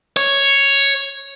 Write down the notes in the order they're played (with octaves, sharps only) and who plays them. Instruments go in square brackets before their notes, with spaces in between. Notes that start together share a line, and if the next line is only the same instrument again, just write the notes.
[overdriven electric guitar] C#5